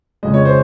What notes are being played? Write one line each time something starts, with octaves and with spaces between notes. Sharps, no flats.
F2 C#3 G#3 D#5
C#5
C5